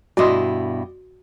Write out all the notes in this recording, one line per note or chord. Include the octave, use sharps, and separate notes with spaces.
G2 B2 E4 F#4 D5 D#5 C6